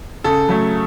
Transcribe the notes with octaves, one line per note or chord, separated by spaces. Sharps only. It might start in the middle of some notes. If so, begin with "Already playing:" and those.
C#3 A4
F#3 A3